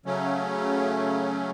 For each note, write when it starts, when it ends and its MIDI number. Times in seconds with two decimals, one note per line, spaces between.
0.06 1.51 49
0.06 1.51 54
0.06 1.51 57
0.06 1.51 61